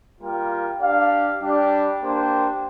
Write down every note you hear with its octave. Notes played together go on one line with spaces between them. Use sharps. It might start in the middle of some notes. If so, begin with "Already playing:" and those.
G3 A#3 F4 A#4 G5
D4 G4 D5 F5
G3 D4 G4 D5
A#3 D4 G4 C5 G5